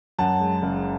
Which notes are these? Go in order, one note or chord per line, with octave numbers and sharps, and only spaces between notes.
F#2 F#5 A5
G#3
F#1